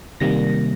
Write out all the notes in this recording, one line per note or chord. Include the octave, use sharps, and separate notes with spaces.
C3 D#3 G3 A#3 A#6